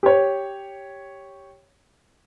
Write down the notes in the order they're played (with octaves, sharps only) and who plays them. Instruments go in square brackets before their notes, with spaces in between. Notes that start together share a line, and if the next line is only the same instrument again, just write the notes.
[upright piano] G4 C#5